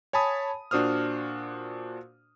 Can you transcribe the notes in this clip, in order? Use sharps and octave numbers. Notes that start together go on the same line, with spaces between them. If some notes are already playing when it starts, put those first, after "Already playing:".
C#5 G#5 A5 B5 D#6
A#2 D4 F#4 C5 D#6 F6